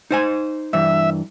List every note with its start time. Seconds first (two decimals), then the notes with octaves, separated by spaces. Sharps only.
0.11 D#4 C5 G#5
0.73 G2 E3 E5